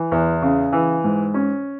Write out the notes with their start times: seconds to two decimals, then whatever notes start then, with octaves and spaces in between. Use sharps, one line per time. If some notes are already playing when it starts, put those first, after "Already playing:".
Already playing: E3
0.12 E2
0.42 C#3
0.72 E3
1.04 G#2
1.34 C#4